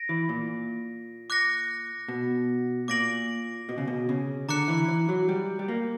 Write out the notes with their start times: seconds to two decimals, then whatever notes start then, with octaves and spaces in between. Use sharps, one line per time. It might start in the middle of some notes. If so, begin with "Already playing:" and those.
Already playing: A#6 D7
0.09 E3
0.29 A#2
1.30 D6 F#6 A#6 C#7
2.08 B2
2.88 A#2 D6 A#6 D7 F#7
3.69 B2
3.78 C#3
3.87 B2
4.09 C#3
4.49 D3 A#5 D6 F#6 C#7
4.68 E3
4.89 E3
5.09 F#3
5.29 G3
5.59 G3
5.68 A#3